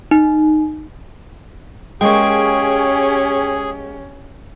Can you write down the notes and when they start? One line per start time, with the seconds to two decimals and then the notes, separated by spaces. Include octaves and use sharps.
0.11 D#4
2.01 G#3 A#3 C#4 G4 G#4 G5 C#6